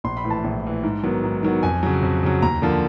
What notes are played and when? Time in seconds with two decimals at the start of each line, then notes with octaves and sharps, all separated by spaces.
0.04 A#1 C6
0.17 B5
0.24 A2 E3
0.30 A5
0.44 A#1
0.64 A2 E3
0.83 G#2
1.03 D#3 F#3 B3
1.24 G#2
1.43 D#3 F#3 B3
1.63 F2 G#5
1.83 C#3 F#3
2.03 F2
2.23 C#3 F#3
2.42 D#2 A#5
2.62 D3 F3 A#3